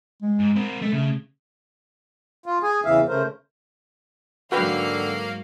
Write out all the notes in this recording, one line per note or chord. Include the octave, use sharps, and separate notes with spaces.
G#3
G#2
C4 A#4
G#3 A3 A4
C#3 A3
F4
G#4 G#5
E2 C#3 E3 E5 F5
C#3 A3 A#4 C5
G#2 D3 F#3 A#3 F#4 B4 F5 G5